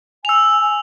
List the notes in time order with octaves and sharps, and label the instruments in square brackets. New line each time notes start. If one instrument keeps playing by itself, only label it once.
[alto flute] G#5 [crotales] E6 F7